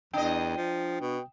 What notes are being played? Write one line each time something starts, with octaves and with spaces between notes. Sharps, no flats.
E2 D4 D#5 G5 D#6
F3
B2